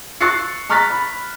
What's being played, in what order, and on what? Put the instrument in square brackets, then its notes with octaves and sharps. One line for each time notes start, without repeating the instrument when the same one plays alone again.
[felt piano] C#6 E6 F#6 A6 C7 C#7
A#5 C#6 F6 F#6 A6 B6
B5